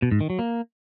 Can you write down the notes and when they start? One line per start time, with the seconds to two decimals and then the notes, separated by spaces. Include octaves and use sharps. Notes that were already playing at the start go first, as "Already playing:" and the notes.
0.02 B2
0.11 G#2
0.21 D#3
0.30 F#3
0.39 A#3